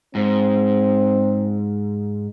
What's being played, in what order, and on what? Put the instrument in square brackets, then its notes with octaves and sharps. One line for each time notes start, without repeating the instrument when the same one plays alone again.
[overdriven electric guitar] G#2 [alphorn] C4